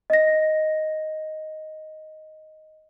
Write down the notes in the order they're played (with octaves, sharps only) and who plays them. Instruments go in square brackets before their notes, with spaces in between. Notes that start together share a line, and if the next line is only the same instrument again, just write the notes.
[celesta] D#5 A#6